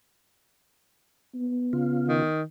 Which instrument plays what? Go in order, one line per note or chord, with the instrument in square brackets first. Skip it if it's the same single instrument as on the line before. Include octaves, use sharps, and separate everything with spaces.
[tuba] B3
[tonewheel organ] C#3 F4
[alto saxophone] D#3